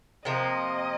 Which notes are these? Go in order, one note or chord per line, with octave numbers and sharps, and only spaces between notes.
C3 F3 A#3 D#5